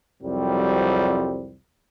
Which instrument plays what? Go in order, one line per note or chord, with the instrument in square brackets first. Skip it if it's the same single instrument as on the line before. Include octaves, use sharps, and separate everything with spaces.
[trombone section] C2 F2 F#3 G3 C4